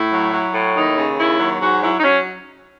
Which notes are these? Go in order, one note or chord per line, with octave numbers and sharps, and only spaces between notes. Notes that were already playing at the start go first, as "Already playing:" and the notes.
Already playing: A2 E4
F#3
F#3
A2
D#2 D#4
C#3
D#2 E4
F#3
G#2 F#4
F#3 E4
D#4
F#3 C#4